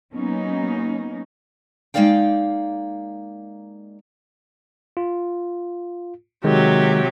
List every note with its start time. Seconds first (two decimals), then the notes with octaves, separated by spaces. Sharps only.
0.13 F#3 A#3 B3 C#4 D#4
1.94 G#3 A#3 D#4 D5 F5 G5
4.97 F4
6.44 C3 D#3 F#3 G#3 G4